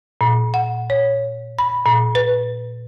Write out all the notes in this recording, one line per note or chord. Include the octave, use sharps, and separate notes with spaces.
A#2
F#5
C#5
B5
A#2
B4